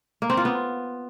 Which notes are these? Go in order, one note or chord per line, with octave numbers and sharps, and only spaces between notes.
A#3
C4
F4
B3